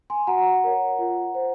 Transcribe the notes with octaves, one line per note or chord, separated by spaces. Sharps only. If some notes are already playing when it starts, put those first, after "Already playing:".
G#5 C6
F#4 F#5 A#5
A#4 C#5
F4
C5